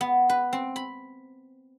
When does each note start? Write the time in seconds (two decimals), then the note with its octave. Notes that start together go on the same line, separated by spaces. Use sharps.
0.01 B3
0.29 B4
0.53 C4
0.76 B5